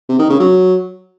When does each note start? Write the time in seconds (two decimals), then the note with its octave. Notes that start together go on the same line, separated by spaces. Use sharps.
0.09 C3
0.19 D#3
0.30 C#3
0.40 F#3